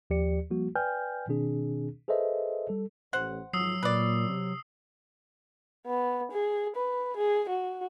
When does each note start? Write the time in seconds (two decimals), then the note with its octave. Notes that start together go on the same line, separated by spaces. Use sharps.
0.10 D#2 F3 G4 D5 C#7
0.51 F3 G3 A#3 F#4
0.75 B4 D5 G5 G#5 F6 G6
1.28 B2 D#3 C4 D4 G#4
2.08 G#4 A4 B4 C5 D#5 E5
2.69 G3 A4
3.13 A1 C5 F#5
3.53 G#1 F3 F#3 D#6 E6 C7
3.83 A#2 B4 D5
4.29 C3
5.87 B3
6.32 G#4
6.76 B4
7.17 G#4
7.49 F#4